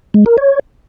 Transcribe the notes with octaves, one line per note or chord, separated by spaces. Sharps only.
G#3
A#4
C#5